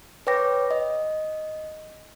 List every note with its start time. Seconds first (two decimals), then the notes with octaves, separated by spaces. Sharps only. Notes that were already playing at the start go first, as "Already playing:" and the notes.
0.27 B4 C#5 G5 D6 A#6
0.71 D#5